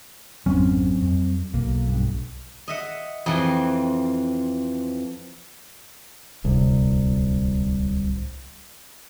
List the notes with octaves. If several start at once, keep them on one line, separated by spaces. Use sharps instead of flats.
G#1 F2 F#3 C4 C#4
F2
B1 A#3
G2
D#5 E5 F#5
F2 E3 C4
D1 C2